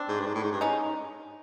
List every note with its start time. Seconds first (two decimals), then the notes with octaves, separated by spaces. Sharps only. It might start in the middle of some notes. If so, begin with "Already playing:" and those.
Already playing: C4 D4
0.08 G#2
0.20 G2
0.27 G#2
0.35 A2
0.43 G#2
0.52 G2
0.61 C#4 D#4